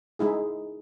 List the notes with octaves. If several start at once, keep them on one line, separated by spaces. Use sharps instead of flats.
G#3 D#4 E4 G#4